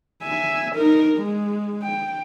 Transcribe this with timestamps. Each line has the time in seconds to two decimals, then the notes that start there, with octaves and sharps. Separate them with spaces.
0.23 E5 G#5
0.75 D#4 A#4
1.18 G#3
1.82 G5